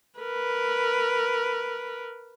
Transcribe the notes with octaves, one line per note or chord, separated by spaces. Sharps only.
A#4 B4